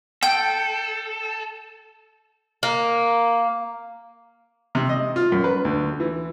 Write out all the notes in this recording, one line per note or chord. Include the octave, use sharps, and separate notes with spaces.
A4 G5
A#3
C3
D#5
F4
F#2
B4
D2
E3